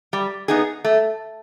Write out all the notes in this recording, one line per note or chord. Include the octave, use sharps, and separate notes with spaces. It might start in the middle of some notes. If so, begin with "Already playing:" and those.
G3
B3 D#4 G#4
A3